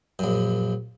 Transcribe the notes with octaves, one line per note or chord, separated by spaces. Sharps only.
A#1 F#2